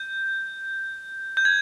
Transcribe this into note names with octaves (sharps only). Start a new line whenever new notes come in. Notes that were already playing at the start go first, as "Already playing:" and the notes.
Already playing: G6
G6
G#6